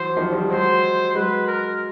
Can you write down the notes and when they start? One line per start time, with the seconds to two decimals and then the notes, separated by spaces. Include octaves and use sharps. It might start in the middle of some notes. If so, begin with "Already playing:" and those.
Already playing: E3 F#3 C5
0.16 D#3 F3
0.32 F3 G3
0.49 F#3 G#3 C5
1.15 F#3 G#3 B4
1.47 A#4